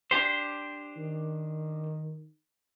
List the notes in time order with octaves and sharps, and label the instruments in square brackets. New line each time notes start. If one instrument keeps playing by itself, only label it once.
[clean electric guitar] D4 G4 C5
[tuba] D#3